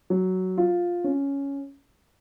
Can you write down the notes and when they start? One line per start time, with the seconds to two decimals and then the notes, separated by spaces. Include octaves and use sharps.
0.10 F#3
0.58 F4
1.04 C#4